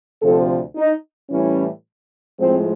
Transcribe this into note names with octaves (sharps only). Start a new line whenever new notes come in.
D2 C3 F3 A4
D#4
A2 E3 G3 C#4
A2 F3 G#3 C4